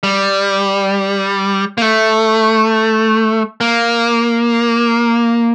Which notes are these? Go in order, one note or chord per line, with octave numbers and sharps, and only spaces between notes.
G3
A#3
A3
A#3